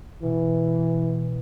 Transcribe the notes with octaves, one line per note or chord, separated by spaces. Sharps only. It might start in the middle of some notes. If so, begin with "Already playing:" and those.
B2 E3